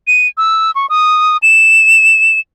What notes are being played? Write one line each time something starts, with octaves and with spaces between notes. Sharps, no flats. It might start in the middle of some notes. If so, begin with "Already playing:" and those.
D#7
E6
C#6
D#6
E7